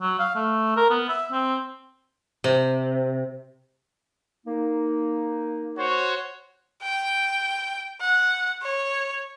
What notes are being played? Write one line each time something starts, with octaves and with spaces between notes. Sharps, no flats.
F#3
F5
A3
A#4
B3
E5
C4
C3
A#3 D#4
F#4 C5 C#5
G5
F#5
C#5